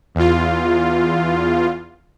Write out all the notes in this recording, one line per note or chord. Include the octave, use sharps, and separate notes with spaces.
E2 F4